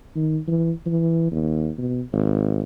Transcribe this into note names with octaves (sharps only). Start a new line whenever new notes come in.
D#3
E3
E3
D#2
B2
G#1